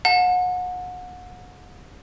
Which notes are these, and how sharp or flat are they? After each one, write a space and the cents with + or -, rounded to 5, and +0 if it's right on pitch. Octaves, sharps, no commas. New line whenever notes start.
F#5 -30 A5 +10